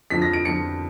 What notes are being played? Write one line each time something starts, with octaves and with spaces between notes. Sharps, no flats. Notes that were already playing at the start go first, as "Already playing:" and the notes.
F2 D3 F3 B6
A#6
D7
F2 D3 F3 C#7